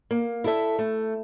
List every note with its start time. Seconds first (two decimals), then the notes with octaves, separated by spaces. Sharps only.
0.11 A#3
0.44 E4 A4 E5
0.79 A3